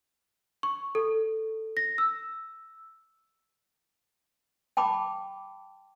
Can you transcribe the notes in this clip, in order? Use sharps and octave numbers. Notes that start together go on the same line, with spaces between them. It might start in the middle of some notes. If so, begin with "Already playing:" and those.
C#6
A4
A#6
E6
G5 A5 B5 D6